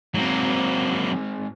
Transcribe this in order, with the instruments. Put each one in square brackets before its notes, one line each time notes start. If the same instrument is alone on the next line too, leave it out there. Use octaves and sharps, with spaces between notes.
[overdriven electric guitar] G#2 C4 [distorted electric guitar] F#3 A#3